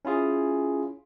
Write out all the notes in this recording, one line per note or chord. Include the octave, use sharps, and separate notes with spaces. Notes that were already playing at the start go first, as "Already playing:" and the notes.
C#4 E4 F4 G#4